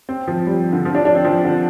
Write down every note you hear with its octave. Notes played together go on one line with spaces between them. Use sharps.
C4
F3
G3
D3
F3
D4
D4
C4
F3
D3